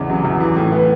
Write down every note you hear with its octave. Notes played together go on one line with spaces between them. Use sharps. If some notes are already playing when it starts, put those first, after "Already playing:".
Already playing: A1 E2 C#3
F#3
E2
E3
A2
B3